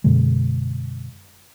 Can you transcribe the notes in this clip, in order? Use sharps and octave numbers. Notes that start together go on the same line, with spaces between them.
F#2 B2 D3 G#3